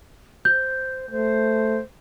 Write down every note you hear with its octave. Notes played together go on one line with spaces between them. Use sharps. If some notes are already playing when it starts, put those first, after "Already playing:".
C5 G6
A3 C5